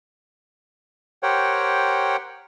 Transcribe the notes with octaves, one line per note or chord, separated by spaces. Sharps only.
G4 A#4 C5 C#5 F#5 G5